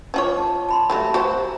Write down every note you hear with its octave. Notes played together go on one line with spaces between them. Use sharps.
F3 F4 C#5 D#5 C#6 D6
A5
A5 B5 C6
F#3 G3 A3 E5 B5
F#4 G4 C5 A#5